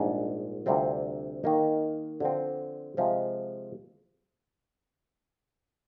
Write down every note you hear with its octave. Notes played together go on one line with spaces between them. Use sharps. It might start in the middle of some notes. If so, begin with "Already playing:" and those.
Already playing: A#1 G#2 G3 D4 G#4
D2 C3 G3 C4 F4
D#3 A#3 D#4
D3 F3 C4
C3 F3 G#3